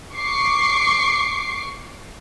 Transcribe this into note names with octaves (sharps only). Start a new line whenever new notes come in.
C#6 D6 C7